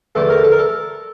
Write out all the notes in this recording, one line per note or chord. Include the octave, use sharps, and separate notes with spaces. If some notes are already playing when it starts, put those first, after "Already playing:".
E2 D3 A3 A4
A#4
A4
A#4
A4